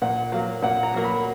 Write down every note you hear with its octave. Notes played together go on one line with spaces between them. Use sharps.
A#2 F#5
F#3 A#3 F5
A#2 F#5
A#5
F#3 A#3
B5